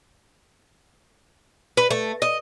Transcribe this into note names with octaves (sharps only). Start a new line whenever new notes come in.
B4
A3
D#5